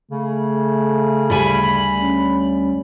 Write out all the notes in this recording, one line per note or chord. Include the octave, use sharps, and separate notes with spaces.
C#3 A3
D2 G3 G#5 B5
C#4